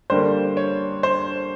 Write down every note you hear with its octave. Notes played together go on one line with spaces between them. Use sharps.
D3 G3 A#3 C5
C#5
C5